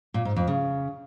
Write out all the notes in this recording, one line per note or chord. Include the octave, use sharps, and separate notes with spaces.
A#2
G#2
F2
C#3